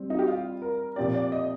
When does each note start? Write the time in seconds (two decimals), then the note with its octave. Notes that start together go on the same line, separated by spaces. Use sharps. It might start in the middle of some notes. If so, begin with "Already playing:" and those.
Already playing: G3 C4
0.10 D#4
0.19 G4
0.27 F4
0.62 A#4
0.96 A#2 F3 C4 G4 D5
1.14 D5
1.32 D#5